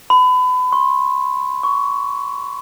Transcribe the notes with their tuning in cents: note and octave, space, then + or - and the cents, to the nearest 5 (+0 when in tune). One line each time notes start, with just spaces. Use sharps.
B5 +30
C6 +45
C#6 +20